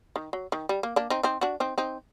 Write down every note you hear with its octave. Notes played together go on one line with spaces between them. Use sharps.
D#3
F#3
D#3
G3
A#3
A#3 D4
C4 D#4
C4 D#4
D4 F#4
C4 D#4
C4 D#4